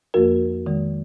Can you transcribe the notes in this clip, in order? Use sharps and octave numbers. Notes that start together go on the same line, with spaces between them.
F2 F3 A#3 F#4 A#4
F2 D#3 G#3